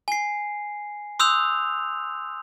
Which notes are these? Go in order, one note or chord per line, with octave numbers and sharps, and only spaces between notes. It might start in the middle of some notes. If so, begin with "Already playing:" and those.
G#5 C7
C6 D#6 E6 F#6 G6 F7